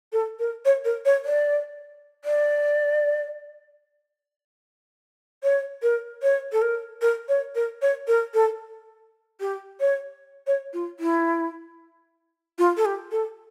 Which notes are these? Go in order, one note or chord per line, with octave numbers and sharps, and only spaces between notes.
A4
A#4
C#5
A#4
C#5
D5
D5
C#5
A#4
C#5
A4
A#4
A#4
C#5
A#4
C#5
A#4
A4
G4
C#5
C#5
F4
E4
F4
A4
G4
A4